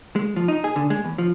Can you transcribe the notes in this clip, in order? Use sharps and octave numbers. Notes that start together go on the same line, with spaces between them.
G#3
F3
D#4
G#4
D3
G#3
E2
F3